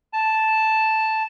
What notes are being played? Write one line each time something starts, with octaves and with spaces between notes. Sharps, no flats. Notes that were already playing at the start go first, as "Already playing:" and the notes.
A5